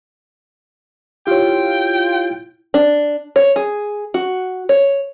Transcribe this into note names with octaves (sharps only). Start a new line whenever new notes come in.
E4 F4 G4 C#5 G5
D4
C#5
G#4
F#4
C#5